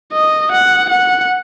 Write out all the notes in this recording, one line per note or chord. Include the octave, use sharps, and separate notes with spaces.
D#5
F#5
F#5